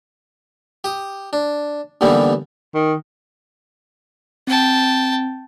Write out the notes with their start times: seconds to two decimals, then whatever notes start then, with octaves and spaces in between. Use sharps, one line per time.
0.84 G4 D#6
1.33 D4
2.01 D#2 D3 E3 G3 B3
2.74 D#3
4.47 C4 G5 A5